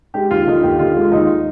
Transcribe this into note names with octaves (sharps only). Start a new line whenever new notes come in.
G#3 G4
D#2 F4
D3 D#4
D#2 G4
D3 F4
G#3
D#2 D#4